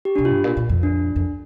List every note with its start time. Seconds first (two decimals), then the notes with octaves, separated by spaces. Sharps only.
0.05 G4
0.16 C3 D4
0.25 F4
0.31 G2
0.44 A#2
0.57 A#2
0.69 F2
0.83 D4
1.16 F2